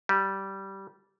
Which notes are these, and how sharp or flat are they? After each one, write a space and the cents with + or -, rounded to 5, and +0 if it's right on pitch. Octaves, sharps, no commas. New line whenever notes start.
G3 -15